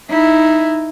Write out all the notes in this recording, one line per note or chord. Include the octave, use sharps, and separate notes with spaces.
D#4 E4